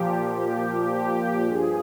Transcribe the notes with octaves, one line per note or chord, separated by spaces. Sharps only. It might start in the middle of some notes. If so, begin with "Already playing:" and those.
Already playing: A#2 F3 G4
G4
G4
G2 F3 G#4